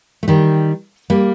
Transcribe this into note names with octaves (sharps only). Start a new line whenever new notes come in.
A3
D#3 G3
G3 A#3